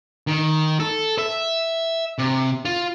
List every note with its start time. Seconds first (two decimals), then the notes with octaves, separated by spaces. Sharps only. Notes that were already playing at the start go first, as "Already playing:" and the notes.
0.27 D#3
0.80 A4
1.18 E5
2.18 C3
2.65 F4